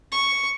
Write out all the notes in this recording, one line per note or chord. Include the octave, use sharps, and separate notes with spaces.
C#6